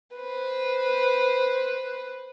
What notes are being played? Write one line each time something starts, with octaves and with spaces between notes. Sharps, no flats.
B4 C5